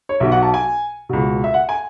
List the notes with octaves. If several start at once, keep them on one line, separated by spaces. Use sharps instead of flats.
C#5
B1 B2 E5
F#5
A5
G#5
C#2 B2
E5
F#5
G#5